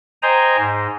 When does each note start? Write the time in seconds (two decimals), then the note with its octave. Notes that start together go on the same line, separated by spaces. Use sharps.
0.23 C5 D#5 G5 G#5 A#5
0.58 G#2